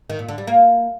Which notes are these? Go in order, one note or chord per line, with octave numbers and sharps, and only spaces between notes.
D#3
A#2
D3
G3
A#3